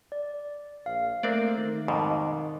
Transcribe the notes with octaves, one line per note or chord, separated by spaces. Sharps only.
D5
A#1 F5
A3 A#3 C4 D4 C5 D5
D#3
F2 G#2 B2 D#4 D6